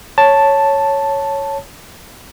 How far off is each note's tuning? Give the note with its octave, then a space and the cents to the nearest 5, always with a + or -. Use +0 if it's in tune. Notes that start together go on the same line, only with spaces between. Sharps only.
C#5 +0 A5 +0